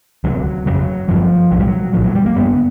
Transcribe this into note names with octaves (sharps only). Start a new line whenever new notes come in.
D2 C3 F#3
G1 F2 C#3 F#3
G1 G2 D3 F3
B1 A2 F#3
G3
F#3
A#1 A2 F3
F#3
G3
A#3
G1 G2 D3 B3